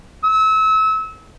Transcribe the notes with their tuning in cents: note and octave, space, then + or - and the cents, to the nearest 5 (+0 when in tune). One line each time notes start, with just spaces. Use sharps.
E6 -30